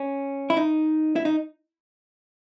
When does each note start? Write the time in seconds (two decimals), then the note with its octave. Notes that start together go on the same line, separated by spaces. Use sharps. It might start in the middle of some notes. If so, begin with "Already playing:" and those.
Already playing: C#4
0.50 E4
0.57 D#4
1.16 E4
1.25 D#4